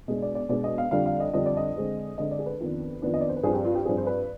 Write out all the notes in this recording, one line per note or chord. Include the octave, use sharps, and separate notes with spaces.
B2 G#3 D4 D#5
D5
D5
B2 G#3 D4 D5
D#5
F5
F2 D3 G3 D4 F5
F5
D#5
F2 D3 G3 D4 D#5
D5
D#5
D3 G#3 C4
D3 G#3 C4 D#5
D5
G#4
B4
F2 D#3 B3 D4
F2 D#3 B3 D4
D#5
D5
C5
B4
G2 F3 C4 G#4
G4
F4
G4
G2 F3 C4 G#4
C5
B4